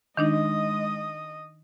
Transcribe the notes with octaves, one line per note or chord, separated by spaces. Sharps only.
D#3 G#3 D4 D#4 D#5 D#6